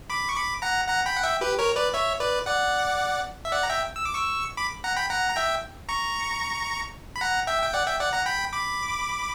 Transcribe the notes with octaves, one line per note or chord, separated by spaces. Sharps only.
B5 D6
C#6
B5 D6
F#5 A#5
F#5 A#5
G5 B5
F#5
E5 G5
G4 B4
A#4 C#5
B4 D5
C#5 E5
B4 D5
D5 F#5
E5
D5 F#5
A#5
E5 G5
E6
D6
C#6 E6
B5 D6
F#5 A#5
G5 B5
F#5 A#5
A#5
E5 G5
A#5 C#6
B5
F#5 A#5
E5 G5
G5
D5 F#5
E5 G5
D5 F#5
F#5 A#5
G5 B5
B5 D6